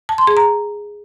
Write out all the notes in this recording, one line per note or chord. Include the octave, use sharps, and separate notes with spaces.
A5
C6
G#4
A#5